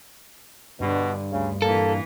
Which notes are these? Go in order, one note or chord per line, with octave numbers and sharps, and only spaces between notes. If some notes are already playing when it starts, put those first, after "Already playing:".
G2 B2 D3
D2 C#3
A#2 E3 A#3 A4